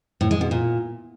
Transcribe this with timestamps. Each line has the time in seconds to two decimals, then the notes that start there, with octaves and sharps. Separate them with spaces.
0.21 A2
0.31 G#3
0.41 B2
0.51 A#2